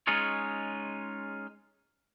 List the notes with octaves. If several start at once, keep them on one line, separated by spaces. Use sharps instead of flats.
G#3 C#4 D#4 F4 G#4 C#5